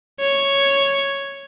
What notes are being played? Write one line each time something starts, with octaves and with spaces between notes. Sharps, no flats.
C#5